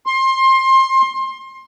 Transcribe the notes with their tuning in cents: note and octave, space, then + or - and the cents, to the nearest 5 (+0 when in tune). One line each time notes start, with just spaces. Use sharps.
C6 +25